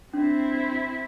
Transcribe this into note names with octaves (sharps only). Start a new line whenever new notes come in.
C4 D4 E4